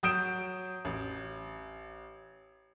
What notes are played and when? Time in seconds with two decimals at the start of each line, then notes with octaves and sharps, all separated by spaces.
0.03 F#3 D#6 G6 D7 E7
0.85 A1